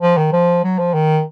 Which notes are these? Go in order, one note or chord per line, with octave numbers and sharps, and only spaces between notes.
F3
D#3
F3
F#3
F3
D#3